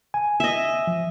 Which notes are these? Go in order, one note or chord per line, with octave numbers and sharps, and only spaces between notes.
G#5
D#5 E5
F3